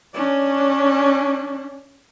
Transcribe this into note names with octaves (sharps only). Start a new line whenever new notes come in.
C#4 D4